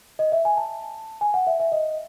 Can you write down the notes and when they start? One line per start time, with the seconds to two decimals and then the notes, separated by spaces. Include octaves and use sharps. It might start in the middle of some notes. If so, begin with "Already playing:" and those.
0.19 D#5
0.32 E5
0.45 G#5
0.57 A5
1.21 G#5
1.34 F#5
1.47 E5
1.60 E5
1.72 D#5